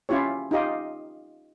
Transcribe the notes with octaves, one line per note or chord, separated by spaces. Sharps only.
C#4 E4 F4 G4 C#5
D#4 F4 G4 D#5 F5